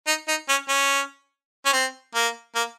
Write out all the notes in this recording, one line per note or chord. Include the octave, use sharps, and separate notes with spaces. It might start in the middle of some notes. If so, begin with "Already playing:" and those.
D#4
D#4
C#4
C#4
C#4
C4
A#3
A#3